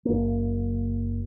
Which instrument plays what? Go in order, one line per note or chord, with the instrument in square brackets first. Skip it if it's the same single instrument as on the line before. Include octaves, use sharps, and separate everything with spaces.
[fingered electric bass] F#1 A#3